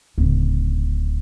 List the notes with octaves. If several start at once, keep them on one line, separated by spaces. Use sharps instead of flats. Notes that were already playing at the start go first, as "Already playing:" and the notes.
D1 C#3